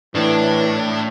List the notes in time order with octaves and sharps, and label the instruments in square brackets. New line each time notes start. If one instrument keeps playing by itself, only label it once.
[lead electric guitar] A2 [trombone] E3 [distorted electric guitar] D4